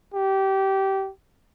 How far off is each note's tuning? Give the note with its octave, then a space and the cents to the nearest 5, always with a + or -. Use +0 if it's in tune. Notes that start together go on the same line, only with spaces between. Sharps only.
G4 -20